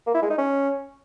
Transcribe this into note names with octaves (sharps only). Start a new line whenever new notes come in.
A#3
E4
G#3
D#4
C#4